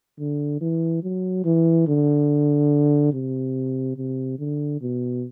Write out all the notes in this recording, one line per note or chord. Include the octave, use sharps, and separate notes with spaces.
D3
E3
F#3
E3
D3
C3
C3
D3
B2